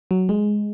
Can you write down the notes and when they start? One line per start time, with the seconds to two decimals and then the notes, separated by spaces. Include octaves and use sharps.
0.11 F#3
0.29 G#3